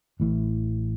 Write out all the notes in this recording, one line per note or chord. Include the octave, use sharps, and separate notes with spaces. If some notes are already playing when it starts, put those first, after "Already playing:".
A1 A2 E3